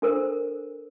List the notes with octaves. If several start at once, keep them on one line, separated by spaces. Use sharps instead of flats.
D4 A4 A#4 C5